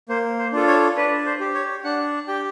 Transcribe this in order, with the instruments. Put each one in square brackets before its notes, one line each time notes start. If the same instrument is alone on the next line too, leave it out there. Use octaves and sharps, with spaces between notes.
[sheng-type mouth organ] A#3 C5
C5
D4 F4 A4
C#5
D4 B4
C5
G4
C#5
D4 F#5
G4 G5